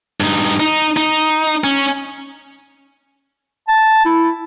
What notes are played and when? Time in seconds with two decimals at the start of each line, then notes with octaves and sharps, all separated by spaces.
0.20 G2 D#4
0.60 D#4
0.97 D#4
1.64 C#4
3.68 A5
4.05 E4